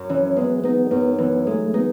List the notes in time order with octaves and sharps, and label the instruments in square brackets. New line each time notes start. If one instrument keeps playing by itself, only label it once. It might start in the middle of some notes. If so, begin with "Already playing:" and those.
Already playing: [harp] F#2
[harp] E3 [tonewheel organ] C#4
[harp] G#3 [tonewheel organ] B3
[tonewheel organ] B3 [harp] D#4
[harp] F#2 [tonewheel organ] B3
[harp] E3 [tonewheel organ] B3
[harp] G#3 [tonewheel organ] A3
[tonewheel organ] B3 [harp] D#4